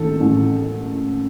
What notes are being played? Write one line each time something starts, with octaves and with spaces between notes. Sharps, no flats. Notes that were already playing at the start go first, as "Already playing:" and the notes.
Already playing: A1 D#3 A4
A1